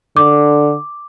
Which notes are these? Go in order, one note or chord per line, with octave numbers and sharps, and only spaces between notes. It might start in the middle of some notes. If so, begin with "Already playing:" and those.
D3 D6